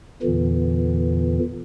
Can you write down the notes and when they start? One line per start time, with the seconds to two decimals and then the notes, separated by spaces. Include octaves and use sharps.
0.23 E2 A#2 D3 E3